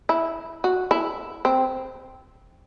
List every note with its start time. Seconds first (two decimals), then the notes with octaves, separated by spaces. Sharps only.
0.09 E4
0.64 F#4
0.91 E4
1.45 C4